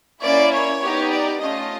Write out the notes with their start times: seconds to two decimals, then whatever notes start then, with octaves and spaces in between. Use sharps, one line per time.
0.22 A#3 C#4 E4 D5
0.51 C#5
0.82 B3 D#4 G4
1.11 D5
1.41 A3 C#4 F4 D#5